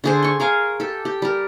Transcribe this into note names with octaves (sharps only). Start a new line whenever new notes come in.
D3 G#4 C5
C6 C#6
G#4 A#4 F5 G#5
G4 A4
G4
G3 A#4